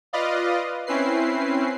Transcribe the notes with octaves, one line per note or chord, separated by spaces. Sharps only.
F4 B4 D5 D#5 F5
C4 C#4 E4 B4 C7